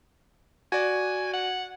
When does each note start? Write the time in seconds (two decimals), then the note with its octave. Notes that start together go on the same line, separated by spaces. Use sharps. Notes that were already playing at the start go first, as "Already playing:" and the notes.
0.72 F#4 D5 G#5
1.33 F#5